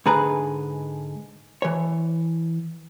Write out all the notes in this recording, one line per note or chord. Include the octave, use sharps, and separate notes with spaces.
G#2 D3 G#4 B4 A#5
E3 C#5